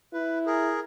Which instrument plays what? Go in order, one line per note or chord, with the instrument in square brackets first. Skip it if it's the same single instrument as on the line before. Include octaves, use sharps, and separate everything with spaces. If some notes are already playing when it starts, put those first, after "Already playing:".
[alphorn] E4 [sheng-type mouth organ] B4
[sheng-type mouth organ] G#4 A#4